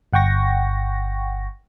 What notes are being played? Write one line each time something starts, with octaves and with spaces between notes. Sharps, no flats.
G1 F#5 G5 C#6 A#6